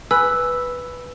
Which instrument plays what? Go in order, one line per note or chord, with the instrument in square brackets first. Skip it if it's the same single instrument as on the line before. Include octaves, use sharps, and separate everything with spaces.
[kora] B4 [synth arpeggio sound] G#5 F#6 [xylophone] E6